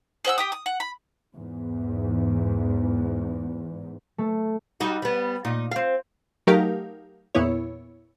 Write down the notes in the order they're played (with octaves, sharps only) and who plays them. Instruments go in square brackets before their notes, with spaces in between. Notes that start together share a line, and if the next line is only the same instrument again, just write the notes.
[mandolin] G#4 C5 F#5 E6
G4 G5 D#6
D#6
F#5
B5
[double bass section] E2 G#2
[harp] A3
[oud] G3 D#4 F#4
G3 B3
A#2 D#4
C4 F5
[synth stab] F#3 A3 D#4 G4 A#4 F5
E2 A#2 B3 E4 C#5